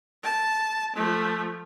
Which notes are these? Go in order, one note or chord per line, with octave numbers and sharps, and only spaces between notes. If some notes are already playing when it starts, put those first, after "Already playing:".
A5
F3 A3